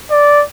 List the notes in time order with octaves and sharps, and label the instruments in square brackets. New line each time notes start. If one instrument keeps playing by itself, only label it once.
[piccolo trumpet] D5